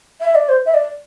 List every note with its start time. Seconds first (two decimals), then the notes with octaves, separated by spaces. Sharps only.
0.21 E5
0.35 D5
0.49 C5
0.66 E5
0.74 D5